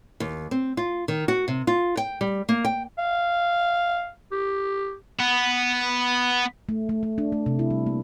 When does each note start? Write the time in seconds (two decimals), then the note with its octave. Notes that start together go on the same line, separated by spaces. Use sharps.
0.20 D#2
0.51 C4
0.77 F4
1.08 D#3
1.28 F#4
1.48 C3
1.67 F4
1.97 G5
2.21 G3
2.49 A#3
2.65 G5
2.98 F5
4.32 G4
5.19 B3
6.69 A3
6.89 A3
7.03 A3
7.18 D4
7.32 A3
7.46 C3
7.59 E4
7.71 G3
7.87 A#3